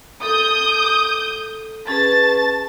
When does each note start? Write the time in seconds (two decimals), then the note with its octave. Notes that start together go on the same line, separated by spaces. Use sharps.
0.23 A4 D#6 G6
1.88 C#4 G#4 B4 A5 A6